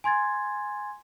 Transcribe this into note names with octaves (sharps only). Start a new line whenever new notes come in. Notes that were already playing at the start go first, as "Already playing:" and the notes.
G#5 C6 G#6 A6